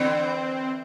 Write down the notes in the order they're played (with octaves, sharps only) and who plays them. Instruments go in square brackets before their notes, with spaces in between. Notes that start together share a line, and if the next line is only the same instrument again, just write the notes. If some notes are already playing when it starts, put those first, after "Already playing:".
Already playing: [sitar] D3 E3 [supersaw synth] C4